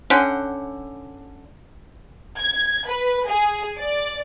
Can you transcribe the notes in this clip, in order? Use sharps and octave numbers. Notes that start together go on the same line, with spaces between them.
D3 C#4 F#5 G5
G#6
B4
G#4
D5